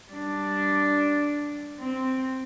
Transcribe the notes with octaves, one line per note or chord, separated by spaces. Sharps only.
G3 D4
C4